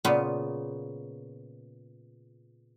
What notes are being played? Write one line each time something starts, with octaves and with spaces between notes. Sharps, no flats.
A#2 C#3 B3 F4